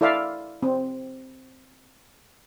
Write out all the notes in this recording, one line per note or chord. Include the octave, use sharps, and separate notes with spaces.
E4 A4 D5 E5 F5
C4